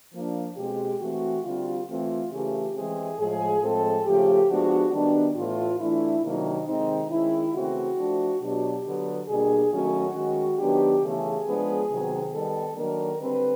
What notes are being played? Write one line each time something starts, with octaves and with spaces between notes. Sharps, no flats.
F3 A#3 D4
B2 G#3 C4 G4
E3 A3 C4 F#4
D3 G3 C4 F4
E3 A3 C4 F4
C#3 E3 A3 C#4 G4
E3 G#3 C4 G#4
A2 F3 G#3 G#4
A2 F3 G#3 C4 A4
C#3 F3 A3 G4
F3 G#3 B3 D4 F#4
D#3 G3 B3 D4
A2 E3 A3 F4
E3 A3 D4 E4
C3 D#3 F#3 A#3 D4 D#4
C3 D#3 G#3 C4 D#4
D#3 G#3 C#4 E4
C#3 E3 A3 C4 F#4
F3 A3 D4
B2 F#3 B3 D4 G4
D3 F#3 B3
B2 G3 A#3 D4 G#4
D#3 F#3 A3 C#4 F#4
D#3 G#3 C#4
D#3 F#3 B3 D4 G4
C#3 E3 A3 G#4
F3 G#3 B3 D4
C3 D#3 F#3 B3
D#3 G3 B3 A4
D#3 F#3 A#3 D4 A#4
D3 G3 C4 B4